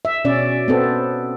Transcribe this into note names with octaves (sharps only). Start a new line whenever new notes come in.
E5
B2 C#4 D5
B3 C4 A4